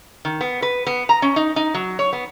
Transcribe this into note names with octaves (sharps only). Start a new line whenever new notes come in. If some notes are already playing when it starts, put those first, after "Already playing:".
D#3
B3
B4
B3
A#5
C#4
D#4
D#4
F#3
C#5
B3